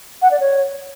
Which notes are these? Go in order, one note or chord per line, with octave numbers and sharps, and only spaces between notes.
F#5
D5
C#5